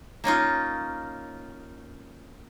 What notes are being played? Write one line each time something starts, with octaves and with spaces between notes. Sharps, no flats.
A#3 C#4 D#4 F4